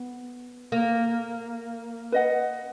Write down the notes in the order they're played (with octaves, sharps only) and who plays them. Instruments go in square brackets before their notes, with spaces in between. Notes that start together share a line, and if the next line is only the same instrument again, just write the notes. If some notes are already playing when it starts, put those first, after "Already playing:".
Already playing: [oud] B3
A#3
[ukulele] B4 D#5 F#5